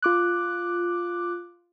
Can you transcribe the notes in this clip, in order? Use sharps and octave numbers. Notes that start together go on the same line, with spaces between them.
F4 D6 F#6